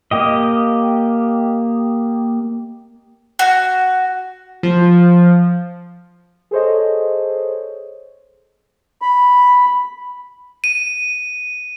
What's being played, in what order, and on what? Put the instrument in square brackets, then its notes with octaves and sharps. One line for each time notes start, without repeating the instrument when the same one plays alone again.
[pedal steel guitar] A#3 G4 D#5
[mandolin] F#4
[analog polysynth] F3
[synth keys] G#4 A4 C5 C#5 D#5
[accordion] B5
[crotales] D#7